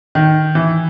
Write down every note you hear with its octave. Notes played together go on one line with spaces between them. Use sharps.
D#3
E3